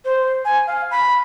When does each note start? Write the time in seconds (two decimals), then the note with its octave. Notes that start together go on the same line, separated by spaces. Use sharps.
0.05 C5
0.45 G#5
0.67 F5
0.91 B5